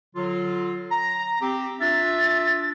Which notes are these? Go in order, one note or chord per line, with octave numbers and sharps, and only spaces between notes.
D3 F#3 F4
A#5
C4 G4
D4 F4 E5 A6